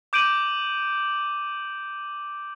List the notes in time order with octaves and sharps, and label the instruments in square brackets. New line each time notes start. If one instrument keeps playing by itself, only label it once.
[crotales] D6 G6 D7 D#7 F#7